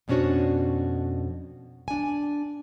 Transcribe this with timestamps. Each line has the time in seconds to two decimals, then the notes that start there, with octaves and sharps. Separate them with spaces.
0.08 F2 B2 C#4 D4 F#4 C#5
1.88 D4 G#5